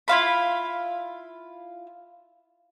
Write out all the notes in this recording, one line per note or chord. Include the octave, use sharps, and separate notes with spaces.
E4 F4 F5 B5